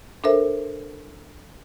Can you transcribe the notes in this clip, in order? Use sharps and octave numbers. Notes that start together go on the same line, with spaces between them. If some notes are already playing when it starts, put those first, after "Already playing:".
D4 A4 A#4 C5 E5